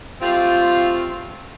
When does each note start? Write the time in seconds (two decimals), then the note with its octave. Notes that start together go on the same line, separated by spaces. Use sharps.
0.21 G3 A3 C4 F4